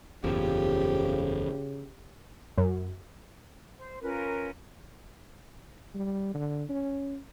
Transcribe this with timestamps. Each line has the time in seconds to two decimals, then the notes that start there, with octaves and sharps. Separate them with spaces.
0.24 F#1 E2 A2 C#3 F3 A#3 G4
2.58 F#2
3.77 C5
4.02 C#4 F4 A#4 B4
5.94 G3
6.34 D3
6.69 C#4